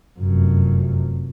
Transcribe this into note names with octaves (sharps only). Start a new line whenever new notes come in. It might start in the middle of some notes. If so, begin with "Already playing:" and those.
F1 F#2